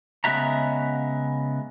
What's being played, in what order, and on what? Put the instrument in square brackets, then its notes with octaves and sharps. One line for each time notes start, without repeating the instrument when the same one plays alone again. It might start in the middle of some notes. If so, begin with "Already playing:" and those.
[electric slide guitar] C#3 G#3 B3 F#4 E5 A#5